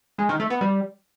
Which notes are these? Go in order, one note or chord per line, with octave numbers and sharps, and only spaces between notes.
G#3
D#3
A3
B3
G3